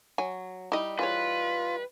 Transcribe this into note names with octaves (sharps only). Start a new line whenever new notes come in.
F#3 G#5
G3 D#4 E4 D#5
E3 F4 G#4 B4 C#5